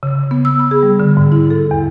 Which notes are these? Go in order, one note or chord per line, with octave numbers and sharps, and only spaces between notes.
C#3
B3
E6
B5
G#4
G3
D3
G#2
E4
A4
E2